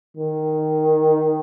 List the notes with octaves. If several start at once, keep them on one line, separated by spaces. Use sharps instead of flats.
D#3